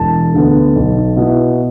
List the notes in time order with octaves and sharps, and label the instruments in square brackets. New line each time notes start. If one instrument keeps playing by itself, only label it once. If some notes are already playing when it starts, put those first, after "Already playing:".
Already playing: [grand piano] E1 A5
D2 D3 B3
B1
B2 B3 E4